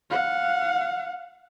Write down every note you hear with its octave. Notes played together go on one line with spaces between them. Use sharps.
F5 F#5